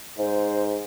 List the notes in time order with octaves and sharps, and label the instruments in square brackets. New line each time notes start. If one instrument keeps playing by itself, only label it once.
[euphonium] G#2 [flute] C5